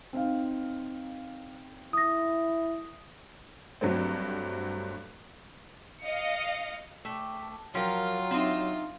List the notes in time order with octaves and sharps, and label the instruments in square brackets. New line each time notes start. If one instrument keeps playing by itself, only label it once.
[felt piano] C4 D#4 F5
[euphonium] E4 [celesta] D#6 A#6
[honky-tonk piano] G2 F#3 A3 C4
[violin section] D#5 F5 C#7
[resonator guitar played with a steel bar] A3 [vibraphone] G5 D6
[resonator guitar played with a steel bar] F3 A#4 [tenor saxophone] F#3 [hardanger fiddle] F4 [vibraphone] G5 A#5
[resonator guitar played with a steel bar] C4 D#4 [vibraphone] D4 E5